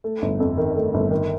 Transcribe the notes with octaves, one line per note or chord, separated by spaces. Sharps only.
A3
G1
F2
D#3
A3
G1
D#3